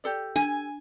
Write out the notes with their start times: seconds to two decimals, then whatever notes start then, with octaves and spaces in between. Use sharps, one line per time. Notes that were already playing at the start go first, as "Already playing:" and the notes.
0.04 G4 A4 D5
0.36 D4 G#5